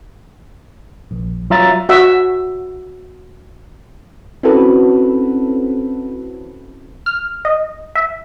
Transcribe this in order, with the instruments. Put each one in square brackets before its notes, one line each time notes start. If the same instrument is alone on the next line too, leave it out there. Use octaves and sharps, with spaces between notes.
[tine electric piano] A#1
F#3 F4 E5 A#5 E6 A6
[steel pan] F#4 E5
[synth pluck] C4 C#4 E4 F#4 A4 B4
F6
D#5
E5